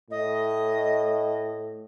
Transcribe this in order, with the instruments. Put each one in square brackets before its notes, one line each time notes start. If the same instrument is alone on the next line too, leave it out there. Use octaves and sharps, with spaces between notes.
[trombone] A2 [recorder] D#5